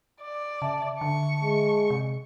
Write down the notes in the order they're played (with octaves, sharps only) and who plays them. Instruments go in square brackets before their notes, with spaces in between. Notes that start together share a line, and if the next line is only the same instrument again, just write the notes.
[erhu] D5
[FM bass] C#3 [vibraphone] E5 A5
[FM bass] D3 [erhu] C#6
[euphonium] G#3
[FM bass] C3